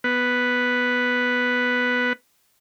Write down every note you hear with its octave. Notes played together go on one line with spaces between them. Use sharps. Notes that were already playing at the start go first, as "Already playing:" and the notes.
B3 B4